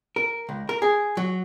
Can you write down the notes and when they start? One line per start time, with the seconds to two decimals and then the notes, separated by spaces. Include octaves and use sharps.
0.16 A#4
0.49 C#2
0.69 A#4
0.82 G#4
1.17 F#3